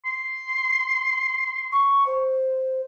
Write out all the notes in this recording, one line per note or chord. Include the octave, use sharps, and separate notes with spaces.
C6
C#6
C5